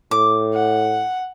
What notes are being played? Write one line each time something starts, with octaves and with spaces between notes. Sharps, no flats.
A2 D6
F#5